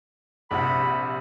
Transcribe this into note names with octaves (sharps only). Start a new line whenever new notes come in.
A#1 C3 F#5 B5